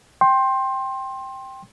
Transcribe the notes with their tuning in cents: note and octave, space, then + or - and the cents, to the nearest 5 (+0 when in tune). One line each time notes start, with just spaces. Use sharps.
G5 +0 C6 +20